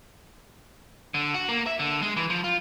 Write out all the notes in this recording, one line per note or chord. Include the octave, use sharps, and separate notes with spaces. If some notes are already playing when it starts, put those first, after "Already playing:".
D3
F#4
A#3
E5
D3
G#3
E3
F3
F4